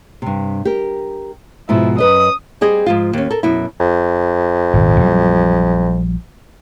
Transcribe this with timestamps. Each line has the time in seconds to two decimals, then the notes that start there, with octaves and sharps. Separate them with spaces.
0.22 G2 C3
0.65 G4 A#4
1.69 G#2 B2 F3 E4
1.98 F#2 B4 D#5 D#6
2.61 G3 C4 G#4 D#5
2.86 G#2 F3 F4
3.13 D#2 C#4
3.31 A4 A#4
3.43 F#2 B2 E4
3.80 F2
4.74 D#1 G#1
5.00 A#1 F#3 G3